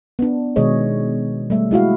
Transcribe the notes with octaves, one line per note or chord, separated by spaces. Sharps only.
B3 D4
B2 D#3 G#3 G#4 C#5 D#5
G3 A3 E5
G#3 E4 F#4 F5